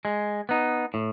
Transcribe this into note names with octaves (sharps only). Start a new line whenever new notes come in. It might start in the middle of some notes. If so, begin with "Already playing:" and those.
G#3
B3 D#4
A2